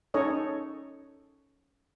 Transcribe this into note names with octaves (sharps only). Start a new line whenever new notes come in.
C#4 D#4 A4 C#5 D#5